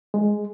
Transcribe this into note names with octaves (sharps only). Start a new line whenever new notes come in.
G#3